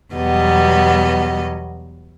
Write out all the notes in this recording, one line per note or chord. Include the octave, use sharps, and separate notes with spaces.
E2 B2 F#3 G3 B3 D#5